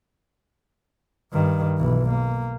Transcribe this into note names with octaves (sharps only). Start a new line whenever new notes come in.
G2 D#3
B1 E3
A#3